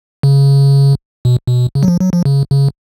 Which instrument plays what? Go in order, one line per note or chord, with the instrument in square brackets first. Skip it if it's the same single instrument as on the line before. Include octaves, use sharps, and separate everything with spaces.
[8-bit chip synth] C#3
B2
B2
C#3
F#3
F3
F#3
F3
C#3
C#3